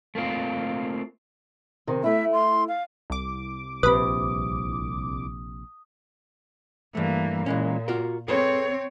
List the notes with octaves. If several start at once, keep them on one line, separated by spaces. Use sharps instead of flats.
A3 A#3 C4 F4
C3 D#3
A3 E4 E5
C6
F5
C2 D6
A#1 C3 B4 B5 D#6
G2 E3 A3 A#3
A#2 E3 G#3 C#4
F4 F#4 A#4
C4 G#4 A4 B4 C#5